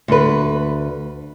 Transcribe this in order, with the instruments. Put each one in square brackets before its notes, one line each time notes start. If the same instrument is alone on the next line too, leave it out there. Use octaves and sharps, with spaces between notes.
[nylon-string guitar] D2 B4